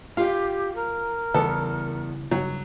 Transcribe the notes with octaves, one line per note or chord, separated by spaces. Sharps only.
F4 G4 F5
A#4
E2 C#3 E3 G3 B3 A4
G2 C#3 F#3